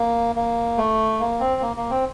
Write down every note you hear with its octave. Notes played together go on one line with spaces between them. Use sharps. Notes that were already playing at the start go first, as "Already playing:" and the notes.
Already playing: A#3
A#3
A3
A#3
C4
A#3
A#3
C4